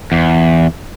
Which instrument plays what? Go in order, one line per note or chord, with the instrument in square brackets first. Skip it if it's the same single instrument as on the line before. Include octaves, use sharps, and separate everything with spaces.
[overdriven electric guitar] E2